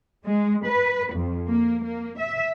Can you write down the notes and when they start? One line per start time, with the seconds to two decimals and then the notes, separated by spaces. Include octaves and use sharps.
0.25 G#3
0.65 B4
1.13 F2
1.48 A#3
1.84 A#3
2.18 E5